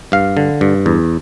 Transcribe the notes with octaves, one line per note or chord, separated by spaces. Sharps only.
G2 F5
D3
G2
E2